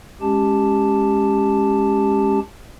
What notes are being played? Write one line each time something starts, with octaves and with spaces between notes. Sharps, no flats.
G#3 C#4 G4 A5